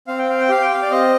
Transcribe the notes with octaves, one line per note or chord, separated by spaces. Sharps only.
C4 F5
G5
F5
G5
G4 F5
G5
F5
D5
C4 D#5